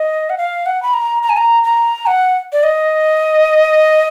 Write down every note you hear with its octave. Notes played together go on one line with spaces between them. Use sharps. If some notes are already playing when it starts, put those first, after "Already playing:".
Already playing: D#5
F#5
F5
F#5
B5
A#5
A#5
G#5
A#5
A#5
F#5
D5
D#5